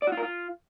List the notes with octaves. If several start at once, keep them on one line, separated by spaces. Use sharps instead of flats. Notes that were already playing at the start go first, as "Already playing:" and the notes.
D5
F#4
F4
A#4
F4